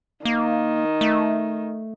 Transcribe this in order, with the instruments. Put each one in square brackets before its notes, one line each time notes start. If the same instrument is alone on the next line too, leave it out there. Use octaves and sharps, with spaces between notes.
[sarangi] D#3 [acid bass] A#3
[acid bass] A3